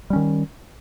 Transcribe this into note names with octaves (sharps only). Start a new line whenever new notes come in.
D#3 G3 C#4